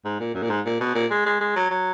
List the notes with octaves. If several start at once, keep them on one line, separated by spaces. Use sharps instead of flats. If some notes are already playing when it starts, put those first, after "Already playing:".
G#2
A#2
F#2
A#2
G#2
A#2
B2
A#2
G#3
G#3
G#3
F#3
F#3